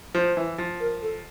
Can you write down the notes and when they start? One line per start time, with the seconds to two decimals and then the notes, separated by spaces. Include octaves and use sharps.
0.14 F3 C5
0.37 E3
0.58 F3
0.80 A#4
1.02 A4